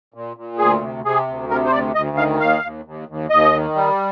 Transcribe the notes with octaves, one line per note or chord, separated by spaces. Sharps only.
A#2
A#2
D2 G#4
C3
C3 G#4
D2
C3 A#4
C5
D2 D5
D2 D#5
D#3 F5
D#2 F5
D#2
D#2
D#2
D#2 D#5
D#3
G3